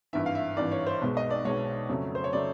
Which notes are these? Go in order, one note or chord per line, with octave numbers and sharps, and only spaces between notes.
G#1 G2 E3 E5
F5
E5
G#1 G2 E3 D5
C#5
C5
B1 B2 G#3
D#5
D5
B1 B2 G#3 C#5
F2 C#3 F#3 A3
C5
C#5
C#3 F#3 A3 D5